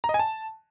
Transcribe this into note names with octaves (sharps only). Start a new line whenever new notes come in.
A#5
D#5
G#5
A5